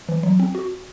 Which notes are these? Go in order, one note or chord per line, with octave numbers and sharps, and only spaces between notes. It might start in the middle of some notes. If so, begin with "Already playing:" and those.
E3
F#3
C4
F#4